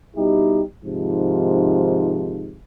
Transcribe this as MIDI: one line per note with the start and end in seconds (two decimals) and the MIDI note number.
0.16 0.62 47
0.16 0.62 55
0.16 0.62 63
0.16 0.62 64
0.16 0.62 67
0.85 2.59 44
0.85 2.59 48
0.85 2.59 51
0.85 2.59 53